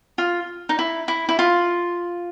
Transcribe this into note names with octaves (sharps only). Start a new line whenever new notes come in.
F4
D#4
E4
E4
E4
F4